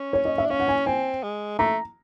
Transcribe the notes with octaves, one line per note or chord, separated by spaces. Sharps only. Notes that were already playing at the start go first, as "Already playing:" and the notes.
Already playing: C#4
C#5
D#5
E5
D4
C#4 F5
F#5
G#5
C4 G#5
G#3
A3 A#5